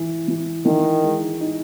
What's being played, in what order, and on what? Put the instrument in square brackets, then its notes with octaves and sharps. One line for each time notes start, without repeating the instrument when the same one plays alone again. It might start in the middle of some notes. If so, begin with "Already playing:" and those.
Already playing: [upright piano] E3
E3
[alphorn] D#3 [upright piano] E3
[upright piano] G#3
D#4